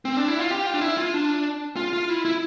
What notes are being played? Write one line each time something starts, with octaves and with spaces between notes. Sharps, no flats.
C4
D4
E4
F4
G4
F4
D4
E4
F4
D4
F4
F4
E4
E4